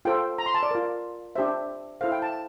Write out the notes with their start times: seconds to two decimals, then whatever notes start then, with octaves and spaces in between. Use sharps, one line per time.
0.05 F4 A4 C5 G5
0.38 A#5
0.46 C6
0.54 A5
0.63 D5
0.71 F4 A#4
1.35 D4 G4 C5 E5
2.01 E4 A4 C5 F5
2.12 G5
2.22 A5